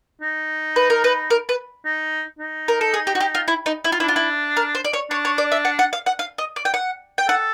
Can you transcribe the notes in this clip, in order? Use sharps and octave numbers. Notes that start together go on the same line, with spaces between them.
D#4
B4
A#4
B4
A#4
B4
D#4
D#4
A#4
A4
G#4
G4
F#4
G4
F4
E4
D#4
E4
F4
D4 E4
F4
E4
A#4
C5
D5
C#5
D4 C#5
C#5
D5
E5
F#5
F#5
F5
F#5
F5
D#5
D5
G5
F#5
G5
A4 F#5